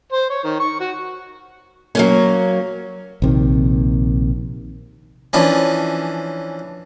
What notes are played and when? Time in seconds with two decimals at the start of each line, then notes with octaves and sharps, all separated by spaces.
0.13 C5
0.30 C#5
0.44 D#3
0.60 C#6
0.80 F#4
1.95 F#3 A#3 C#4
3.22 A#1 C3 D#3
5.33 E3 F3 C#4 D4